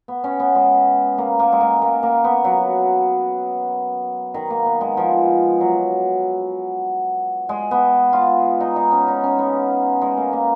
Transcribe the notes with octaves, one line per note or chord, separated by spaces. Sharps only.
B3
C#4
B3
G#3
A#3
A#3
G#3
A#3
A#3
A#3
B3
F#3
D#3
A#3
B3
G#3
F3
F#3
G#3
B3
F4
D#4
D#4
C#4
D#4
C#4
B3
G#3
A#3
A#3